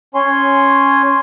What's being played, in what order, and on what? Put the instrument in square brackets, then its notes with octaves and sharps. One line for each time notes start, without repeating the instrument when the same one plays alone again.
[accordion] C#4 C#5 G#5 C6